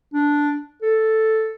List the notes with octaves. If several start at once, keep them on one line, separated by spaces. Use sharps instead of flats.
D4
A4